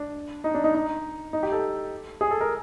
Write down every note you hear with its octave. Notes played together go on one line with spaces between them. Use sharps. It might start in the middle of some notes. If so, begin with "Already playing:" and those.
Already playing: D4
D#4
D4
D#4
D#4
D#4
G4
A4
G#4
A4
A#4